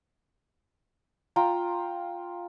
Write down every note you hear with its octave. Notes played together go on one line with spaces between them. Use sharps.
F4 G5 A#5